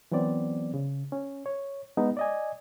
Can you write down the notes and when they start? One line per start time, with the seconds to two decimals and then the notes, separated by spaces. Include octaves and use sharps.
0.11 E3 F#3 B3 C4 D5
0.74 C#3
1.12 C#4
1.46 C#5
1.97 G#3 B3 D#4
2.17 D5 D#5 G#5